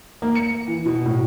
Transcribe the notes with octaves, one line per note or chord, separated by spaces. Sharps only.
A#3
C#7
E3
B2
A2